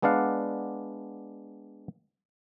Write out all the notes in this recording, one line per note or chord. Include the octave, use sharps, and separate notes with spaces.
G#3 B3 D4 D5 F5 F#5